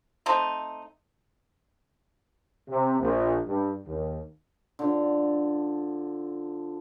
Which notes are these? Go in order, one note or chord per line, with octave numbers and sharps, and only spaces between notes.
A3 C4 D#4
C3
A#1
G2
D#2
D3 F3